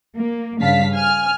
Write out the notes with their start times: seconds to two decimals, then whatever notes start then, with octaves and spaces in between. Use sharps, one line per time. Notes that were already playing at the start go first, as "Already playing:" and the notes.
0.16 A#3
0.60 G2 C#3 F5 A5 B6
0.92 G#5 F6